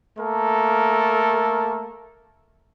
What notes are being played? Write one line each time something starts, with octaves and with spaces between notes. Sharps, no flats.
A3 A#3 A4 A#4